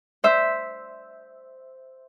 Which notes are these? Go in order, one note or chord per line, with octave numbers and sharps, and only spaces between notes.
C5 E5